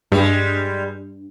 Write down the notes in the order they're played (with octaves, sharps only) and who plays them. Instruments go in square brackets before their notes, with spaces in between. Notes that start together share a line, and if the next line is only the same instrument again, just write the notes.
[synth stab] G2 [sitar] G3 G#3